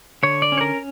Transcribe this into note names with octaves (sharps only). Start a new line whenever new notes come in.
D3 C#5
D5
C#4
C#5
A#4